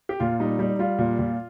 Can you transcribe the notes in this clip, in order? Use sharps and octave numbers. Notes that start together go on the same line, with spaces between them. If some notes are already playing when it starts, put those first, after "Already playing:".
G4
A#2 F4
G3 D#4
G3 D#4
G3 F4
A#2
A#2